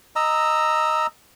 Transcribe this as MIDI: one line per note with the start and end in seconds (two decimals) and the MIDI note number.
0.16 1.07 75
0.16 1.07 82
0.16 1.07 88